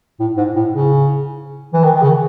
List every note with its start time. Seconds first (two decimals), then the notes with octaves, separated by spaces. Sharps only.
0.20 A2
0.37 G#2
0.56 A2
0.73 C#3
1.74 E3
1.84 D#3
1.96 D#3
2.02 C#3